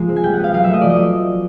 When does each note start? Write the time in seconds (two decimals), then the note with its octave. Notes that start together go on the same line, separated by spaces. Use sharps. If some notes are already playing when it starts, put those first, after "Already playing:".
Already playing: F3 G#3 A#3
0.09 C4
0.16 G#5
0.23 G3 G5
0.33 F#5
0.39 B3 F5
0.53 F#3 F5
0.64 A3 E5
0.73 D#5
0.81 F3 D5
0.90 D#5